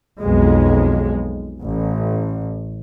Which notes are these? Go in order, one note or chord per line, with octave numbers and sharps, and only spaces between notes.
B1 F2 G#3
A1